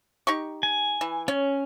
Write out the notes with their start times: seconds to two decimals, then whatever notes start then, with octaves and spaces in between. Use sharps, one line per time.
0.27 D#4 G4 C#6
0.63 G#5
1.01 E3
1.28 C#4 C#5